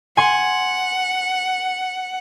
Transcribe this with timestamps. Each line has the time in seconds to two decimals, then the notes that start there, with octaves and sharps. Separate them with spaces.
0.17 F#5 G#5 C6